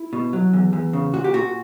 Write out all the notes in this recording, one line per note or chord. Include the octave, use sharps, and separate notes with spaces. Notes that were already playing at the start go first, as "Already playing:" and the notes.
Already playing: E4
B2
F#3
E2
E2
C#3
A#2 F#4
G4
A#2 F#4